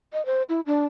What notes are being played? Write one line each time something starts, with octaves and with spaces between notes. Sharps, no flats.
D#5
C5
E4
D4